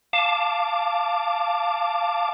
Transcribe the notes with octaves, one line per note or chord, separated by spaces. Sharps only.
F5 A5 D6